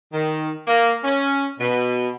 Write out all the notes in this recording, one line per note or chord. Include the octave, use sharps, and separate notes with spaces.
D#3
A#3
C#4
B2